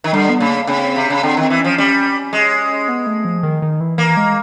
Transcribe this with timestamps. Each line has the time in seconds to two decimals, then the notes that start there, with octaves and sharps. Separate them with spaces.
0.04 D#3
0.13 D3 G3
0.29 B3
0.40 C#3 A#3
0.67 C#3 C4
0.96 C3
1.10 C#3
1.23 D3 C4
1.37 D#3 C4
1.50 E3
1.60 F3 C#4
1.78 G3 C#4
2.33 G#3
2.89 B3
3.07 A3
3.25 F3
3.43 D#3
3.62 D#3
3.80 E3
3.98 E3 A#3
4.17 G#3